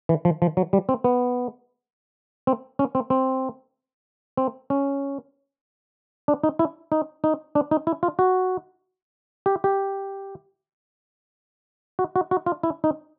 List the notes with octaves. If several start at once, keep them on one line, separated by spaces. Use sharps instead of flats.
E3
F3
F3
F#3
G3
C4
B3
C4
C#4
C4
C4
C4
C#4
D4
D#4
E4
D#4
D#4
D4
D#4
E4
F4
F#4
G4
G4
F#4
F#4
F#4
F4
E4
D#4